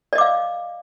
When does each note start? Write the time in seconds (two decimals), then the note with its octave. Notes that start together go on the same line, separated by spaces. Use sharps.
0.13 D5
0.15 D#5
0.18 D6
0.21 F5